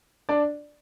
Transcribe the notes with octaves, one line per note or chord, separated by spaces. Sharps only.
D4 D5